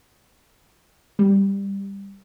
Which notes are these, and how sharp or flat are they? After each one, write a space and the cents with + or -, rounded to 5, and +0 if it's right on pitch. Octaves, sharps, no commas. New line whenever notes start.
G3 +15